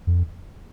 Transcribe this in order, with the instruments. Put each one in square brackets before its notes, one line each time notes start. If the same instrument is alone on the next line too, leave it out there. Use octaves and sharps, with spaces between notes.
[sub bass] F2